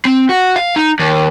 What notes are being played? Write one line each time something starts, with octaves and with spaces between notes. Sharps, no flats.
C4
F#4
F5
D#4
D#2